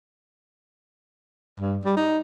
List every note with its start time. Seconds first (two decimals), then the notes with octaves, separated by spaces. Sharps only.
1.60 G2
1.84 G3
1.97 D#4